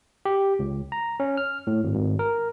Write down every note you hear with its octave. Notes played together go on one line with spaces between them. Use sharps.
G4
C#2
A#5
C#4
F6
A2
G#1
G#1
A#4